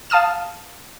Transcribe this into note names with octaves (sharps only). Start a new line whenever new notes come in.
F5 A5 D#6 F6 E7